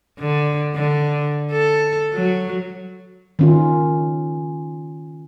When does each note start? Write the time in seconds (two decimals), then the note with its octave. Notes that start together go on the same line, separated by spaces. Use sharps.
0.19 D3
0.75 D3
1.51 A4
2.14 F#3
3.39 D#3 C#4 F4